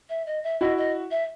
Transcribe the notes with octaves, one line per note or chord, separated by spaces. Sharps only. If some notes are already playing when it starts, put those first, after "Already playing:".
E5
D#5
E5
E4 F#4 D#5
D#5
E5